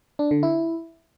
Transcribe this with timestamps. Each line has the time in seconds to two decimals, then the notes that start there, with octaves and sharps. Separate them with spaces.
0.19 D4
0.31 D3
0.43 E4